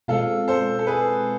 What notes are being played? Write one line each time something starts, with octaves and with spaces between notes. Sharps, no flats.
B2 G#3 C4 F4 A4
A4 C5
A4
G#4 B4